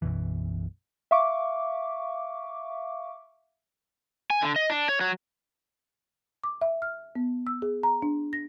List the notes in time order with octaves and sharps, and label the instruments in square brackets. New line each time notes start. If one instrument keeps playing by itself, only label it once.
[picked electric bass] B1 F#2 B2 E3
[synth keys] E5 F5 C#6 D6
[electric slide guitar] G#5
D3
D#5
D4
C#5
F#3
[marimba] D6
E5
F6
B3
E6
G#4
A#5
D4
A#6